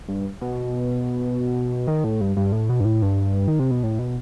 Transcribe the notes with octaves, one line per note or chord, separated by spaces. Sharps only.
G2
B2
D#3
A2
G2
G2
A2
B2
G2
A2
G2
D#3
C3
B2
A2
B2